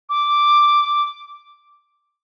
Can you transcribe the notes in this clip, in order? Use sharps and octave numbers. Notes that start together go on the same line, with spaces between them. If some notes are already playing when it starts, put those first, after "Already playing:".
D6